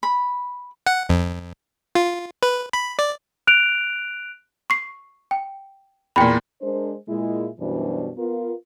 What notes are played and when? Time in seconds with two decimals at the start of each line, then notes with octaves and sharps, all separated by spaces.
0.03 B5
0.86 F#5
1.09 F2
1.95 F4
2.43 B4
2.73 B5
2.99 D5
3.47 F#6 D7 F7
4.70 C#6 C7
5.31 G5
6.16 E2 A#2 G5 B5
6.61 G#3 D4 A#4 C5
7.08 A#2 G#3 E4
7.59 F#2 B2 E3 G3 D4 C5
8.17 B3 F4 A#4